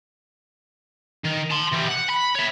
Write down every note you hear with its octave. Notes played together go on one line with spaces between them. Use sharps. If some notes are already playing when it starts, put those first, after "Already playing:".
D#3
A5 C6
E3 G3
F#5
B5
C#5 E5